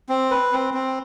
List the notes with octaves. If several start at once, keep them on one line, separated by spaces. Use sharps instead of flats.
C4
B4
C4
C4